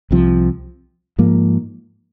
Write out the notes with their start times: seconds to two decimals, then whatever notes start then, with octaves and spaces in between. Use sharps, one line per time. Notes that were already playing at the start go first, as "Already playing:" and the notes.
0.11 C2 C3 F3
1.18 G#2 F3 A#3